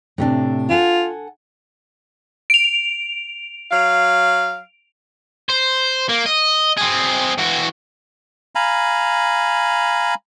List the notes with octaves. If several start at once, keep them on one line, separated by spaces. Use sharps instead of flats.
A2 C3 D4
F4 A4 F#5 G#5
D7 F7
F#3 F5
C5
A#3
D#5
C4 G#4
E3 F#4
F5 G#5 A#5 B5